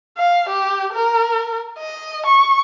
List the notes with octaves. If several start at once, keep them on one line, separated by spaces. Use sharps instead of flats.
F5
G4
A#4
D#5
C#6